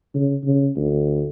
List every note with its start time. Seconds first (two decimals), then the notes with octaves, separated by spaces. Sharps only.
0.15 C#3
0.44 C#3
0.76 D2